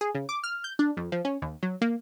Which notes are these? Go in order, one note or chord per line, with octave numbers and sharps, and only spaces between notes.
G#4
C#3
D6
F6
G6
D4
F2
F3
C#4
D#2
F#3
A#3